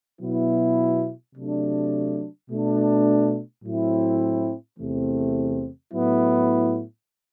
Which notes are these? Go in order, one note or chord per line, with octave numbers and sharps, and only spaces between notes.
B2 F#3 B3 E4
C3 F#3 A3 D4
B2 A3 D4
A2 F#3 C4 E4
E2 C3 E3 A3 C4
A2 F#3 B3 E4